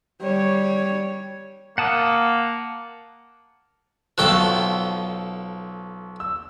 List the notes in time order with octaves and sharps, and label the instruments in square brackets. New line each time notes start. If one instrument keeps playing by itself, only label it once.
[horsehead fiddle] G3 C#5
[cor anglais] A#3 [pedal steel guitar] F#5 A5 D#6
[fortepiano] B1 C#6 F#6 [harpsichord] F3 A4 G5
[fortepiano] E6